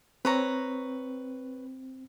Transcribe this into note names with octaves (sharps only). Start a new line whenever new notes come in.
C4 B4 C#5 A#5